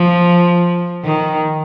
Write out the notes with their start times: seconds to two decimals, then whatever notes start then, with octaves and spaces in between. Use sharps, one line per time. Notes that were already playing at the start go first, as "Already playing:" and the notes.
Already playing: F3
1.04 D#3